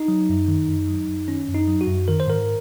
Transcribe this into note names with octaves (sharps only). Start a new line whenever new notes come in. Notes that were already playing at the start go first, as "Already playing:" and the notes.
Already playing: D#4
F#3
F#2
D#3
F#2
F#3
F#2
D#3 C#4
F#2
D#4
F#3
F#4
F#2
D#3 A#4
C5
G#2 A#4